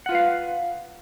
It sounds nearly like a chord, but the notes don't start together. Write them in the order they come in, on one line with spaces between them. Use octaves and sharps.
F#5 F4 B4 F5